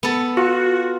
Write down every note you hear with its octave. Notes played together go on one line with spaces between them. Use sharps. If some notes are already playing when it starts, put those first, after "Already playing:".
B3 A4
F4 F#4